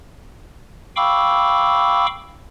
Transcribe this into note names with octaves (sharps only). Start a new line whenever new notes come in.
F5 G5 B5 C#6 D6 E6